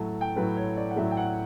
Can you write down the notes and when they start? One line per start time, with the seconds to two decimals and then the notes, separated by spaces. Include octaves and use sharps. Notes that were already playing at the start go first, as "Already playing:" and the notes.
Already playing: A2 F#3 A3 A5
0.21 G5
0.36 A2 F#3 A3 B4
0.57 C#5
0.77 D5
0.91 F#5
0.96 A2 F#3 A3 E5
1.11 G5
1.17 F#5